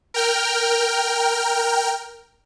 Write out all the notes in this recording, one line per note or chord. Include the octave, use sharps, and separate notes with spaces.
A#4 G5 F6